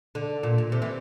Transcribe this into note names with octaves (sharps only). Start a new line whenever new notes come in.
D3
A#2
A#2
C3
E3